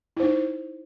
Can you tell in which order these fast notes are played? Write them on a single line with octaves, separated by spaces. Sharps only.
E4 C5 D#4